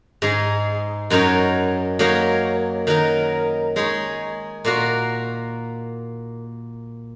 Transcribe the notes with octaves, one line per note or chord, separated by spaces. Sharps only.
G#2 G#3 D#4 G#4
F#2 F#3 D#4 A#4 C#5
F#3 A#3 D#4 A#4 C#5
D#3 F#3 D#4 A#4
G#3 D#4 G#4 C#5
A#2 A#3 F#4 A#4